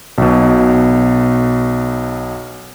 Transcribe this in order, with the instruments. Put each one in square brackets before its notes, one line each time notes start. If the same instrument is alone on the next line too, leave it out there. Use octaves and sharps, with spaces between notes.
[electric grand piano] B1 B2